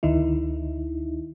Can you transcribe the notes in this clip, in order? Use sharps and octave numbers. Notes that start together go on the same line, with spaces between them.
D2 D#3 D#4 E4